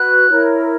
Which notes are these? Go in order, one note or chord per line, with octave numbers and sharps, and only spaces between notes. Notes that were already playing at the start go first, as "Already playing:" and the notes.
Already playing: F#4 B4 F#6
E4 A#4 C#5